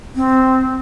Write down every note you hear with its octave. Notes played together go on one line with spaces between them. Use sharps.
C4